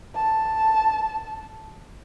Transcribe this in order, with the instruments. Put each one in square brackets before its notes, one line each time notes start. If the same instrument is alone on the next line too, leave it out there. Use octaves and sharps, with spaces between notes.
[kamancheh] A5